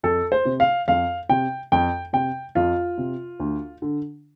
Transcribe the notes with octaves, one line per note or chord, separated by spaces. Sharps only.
F2 A4
C5
C3
F5
F2 F5
C3 G5
F2 G5
C3 G5
F2 F4
C3
D2
D3